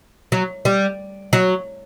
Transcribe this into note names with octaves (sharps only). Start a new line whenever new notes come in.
F#3
G3
F#3